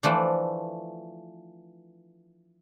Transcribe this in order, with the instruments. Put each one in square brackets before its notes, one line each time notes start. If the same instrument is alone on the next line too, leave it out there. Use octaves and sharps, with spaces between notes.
[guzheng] E3 F3 A3 D4